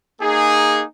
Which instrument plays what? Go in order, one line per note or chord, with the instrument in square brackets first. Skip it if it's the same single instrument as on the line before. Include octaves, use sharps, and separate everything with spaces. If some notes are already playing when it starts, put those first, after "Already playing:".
[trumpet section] A#3 D#4 G#4